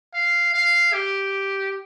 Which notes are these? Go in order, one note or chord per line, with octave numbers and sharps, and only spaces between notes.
F5
F5
G4